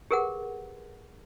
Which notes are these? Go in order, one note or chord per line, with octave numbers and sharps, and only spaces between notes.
G4 G#4 A#4 B4 F#5